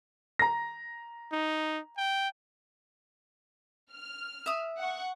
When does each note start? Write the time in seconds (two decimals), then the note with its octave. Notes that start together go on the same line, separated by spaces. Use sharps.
0.39 A#5 A#6
1.32 D#4
1.98 G5
3.92 F6
4.46 E5 D#6
4.79 F#5 C#6